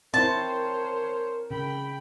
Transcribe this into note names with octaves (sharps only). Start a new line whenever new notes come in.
C4 E4 A#4 C5 C#5 A5
C#3 G5 B5